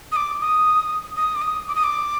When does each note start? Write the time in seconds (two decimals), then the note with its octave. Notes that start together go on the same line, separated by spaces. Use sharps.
0.12 D#6
0.16 D6
0.41 D#6
1.17 D#6
1.35 D6
1.42 D#6
1.68 D6
1.75 D#6
1.84 D6